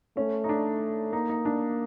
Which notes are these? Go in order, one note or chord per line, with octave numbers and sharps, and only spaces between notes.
A3 C#4
D#4
D4
A#3 D#4
D#4
D4